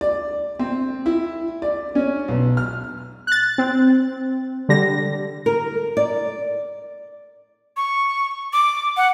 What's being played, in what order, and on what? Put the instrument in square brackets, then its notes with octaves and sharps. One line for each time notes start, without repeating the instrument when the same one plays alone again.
[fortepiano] D5
C4
E4
D5
C#4
B1
F6
[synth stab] F#6 A6
C4
D3 G3 A#6
[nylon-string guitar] A#4
D5
[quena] C#6
D6
F#5